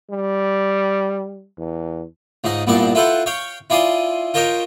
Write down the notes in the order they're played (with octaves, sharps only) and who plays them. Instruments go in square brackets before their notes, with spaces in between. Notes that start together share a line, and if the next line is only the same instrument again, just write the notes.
[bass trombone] G3
E2
[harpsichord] C#2 G#2 D#4 D#5
C2 G2 A#2 B3 D5 A5
E4 F4 A4 B4 C5 F#5
C#5 F5 G5 C#6
E4 F4 D5 G#5 C6 D#6
F4 A#4 C5 C#5 D#5 G5